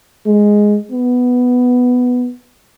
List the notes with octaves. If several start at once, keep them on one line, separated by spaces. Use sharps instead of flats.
G#3
B3